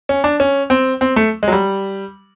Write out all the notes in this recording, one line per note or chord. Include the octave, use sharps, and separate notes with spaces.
C#4
D4
C#4
C4
C4
A3
G#3
F#3
G3